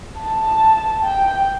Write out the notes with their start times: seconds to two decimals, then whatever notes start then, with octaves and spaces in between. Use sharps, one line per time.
0.20 A5
1.03 G5